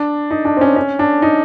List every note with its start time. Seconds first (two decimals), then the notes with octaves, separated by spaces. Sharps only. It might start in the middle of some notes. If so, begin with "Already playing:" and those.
Already playing: D4
0.31 D#4
0.45 D4
0.57 C4
0.61 C#4
0.76 C#4
0.99 D4
1.22 D#4